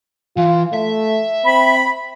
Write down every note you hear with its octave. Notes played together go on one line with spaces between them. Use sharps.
E3 F4
A3 E5
C4 B5